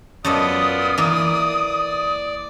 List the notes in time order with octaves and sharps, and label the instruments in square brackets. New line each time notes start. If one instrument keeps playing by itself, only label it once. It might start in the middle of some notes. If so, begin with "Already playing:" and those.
[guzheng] F#2 A4 D#5 [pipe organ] B3 F4 D5 [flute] D#6
[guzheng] E3 A#3 [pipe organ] D5